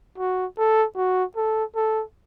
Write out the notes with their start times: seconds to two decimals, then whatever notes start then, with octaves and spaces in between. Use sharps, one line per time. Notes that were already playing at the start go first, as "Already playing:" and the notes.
0.18 F#4
0.57 A4
0.96 F#4
1.36 A4
1.76 A4